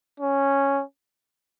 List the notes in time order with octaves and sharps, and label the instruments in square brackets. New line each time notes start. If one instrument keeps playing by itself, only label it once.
[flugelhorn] C#4